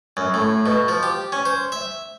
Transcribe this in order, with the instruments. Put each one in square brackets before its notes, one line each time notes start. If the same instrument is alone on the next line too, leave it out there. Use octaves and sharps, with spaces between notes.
[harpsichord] F#2
A2
B2
F3
G4
C#4
C5
E5